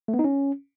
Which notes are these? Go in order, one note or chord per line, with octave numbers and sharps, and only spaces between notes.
A3
B3
D#4
C#4